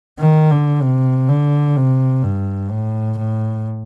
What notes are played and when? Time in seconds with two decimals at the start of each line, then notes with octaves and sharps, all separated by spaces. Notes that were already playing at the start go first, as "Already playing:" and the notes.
0.18 D#3
0.50 D3
0.81 C3
1.28 D3
1.76 C3
2.23 G2
2.71 A2
3.18 A2